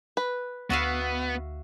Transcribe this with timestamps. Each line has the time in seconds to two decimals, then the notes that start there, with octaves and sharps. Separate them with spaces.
0.17 B4
0.70 D2 B3 F#4 E5 F5